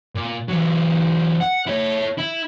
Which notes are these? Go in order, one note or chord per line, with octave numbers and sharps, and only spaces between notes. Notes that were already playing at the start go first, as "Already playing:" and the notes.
A#2
E3 F#3
F#5
E4 C#5
E4